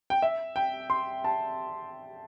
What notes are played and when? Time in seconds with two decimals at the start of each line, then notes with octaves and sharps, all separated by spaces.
0.10 G5
0.22 E5
0.56 G5
0.90 C6
1.24 A5